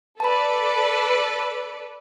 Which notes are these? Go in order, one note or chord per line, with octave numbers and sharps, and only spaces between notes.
A4 B4 D5 A5 B5